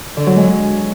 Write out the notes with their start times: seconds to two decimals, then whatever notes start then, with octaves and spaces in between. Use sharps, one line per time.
0.17 D3
0.26 F#3
0.36 G#3